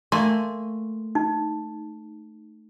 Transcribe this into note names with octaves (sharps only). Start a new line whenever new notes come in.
A3 A#3 G#5 C6
D#4